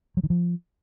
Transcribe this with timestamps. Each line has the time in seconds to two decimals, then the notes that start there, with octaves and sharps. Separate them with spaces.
0.17 F#3
0.23 D#3
0.30 F3